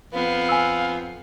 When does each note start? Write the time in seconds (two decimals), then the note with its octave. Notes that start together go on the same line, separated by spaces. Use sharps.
0.13 F2 B3 F5
0.49 G#5 E6